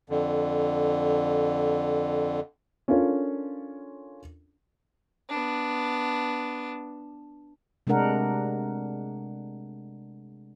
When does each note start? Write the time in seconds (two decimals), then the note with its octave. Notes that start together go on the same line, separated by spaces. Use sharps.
0.10 F2 D3
2.88 C#4 D4 F4 A4 A#4 C#5
5.30 B3 D4
7.87 C3 G#3 A3 D4 A#4 F#5